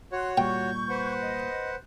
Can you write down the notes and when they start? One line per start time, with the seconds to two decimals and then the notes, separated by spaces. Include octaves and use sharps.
0.12 F#4 C#5 C6 F#6
0.38 A#2 G3 G5 C#6 G6
0.89 B4 C5 F#5
1.20 D#5